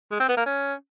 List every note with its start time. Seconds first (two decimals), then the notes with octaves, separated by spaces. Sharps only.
0.11 G#3
0.20 C4
0.29 B3
0.37 A#3
0.46 C#4